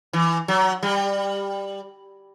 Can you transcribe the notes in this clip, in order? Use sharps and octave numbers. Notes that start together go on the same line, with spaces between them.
E3
F#3
G3